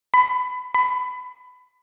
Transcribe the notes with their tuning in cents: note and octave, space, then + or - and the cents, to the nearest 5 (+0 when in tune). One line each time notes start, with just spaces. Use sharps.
B5 +20
B5 +20